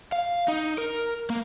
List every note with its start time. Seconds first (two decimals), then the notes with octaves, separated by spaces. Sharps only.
0.12 F5
0.48 D#4
0.78 A#4
1.30 A#3